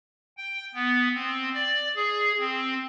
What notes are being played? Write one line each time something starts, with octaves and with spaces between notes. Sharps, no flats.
G5
B3
C4
D5
G#4
C4